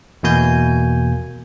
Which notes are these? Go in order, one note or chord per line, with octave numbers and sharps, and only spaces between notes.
E2 B2 A#3 G#5 G6